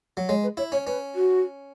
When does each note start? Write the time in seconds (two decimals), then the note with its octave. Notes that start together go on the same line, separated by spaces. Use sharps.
0.17 F#3
0.29 G#3 C#5
0.43 B4
0.57 E4 C#5
0.72 C#4 C#5
0.86 C#4 B4
1.15 F#4